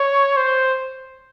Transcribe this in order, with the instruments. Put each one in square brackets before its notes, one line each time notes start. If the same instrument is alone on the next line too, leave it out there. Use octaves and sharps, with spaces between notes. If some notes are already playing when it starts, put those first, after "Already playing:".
Already playing: [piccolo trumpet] C#5
C5